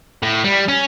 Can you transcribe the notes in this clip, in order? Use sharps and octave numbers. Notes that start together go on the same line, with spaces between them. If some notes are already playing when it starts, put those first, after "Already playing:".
A2
G3
C#4